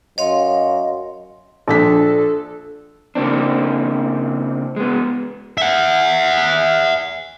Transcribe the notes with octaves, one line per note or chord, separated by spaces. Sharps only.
F#2 C#5 D#5 F5 C6
A#1 D4 A4 B6
C#3 A#3 C4 D4
G#3 B3
E5 F#5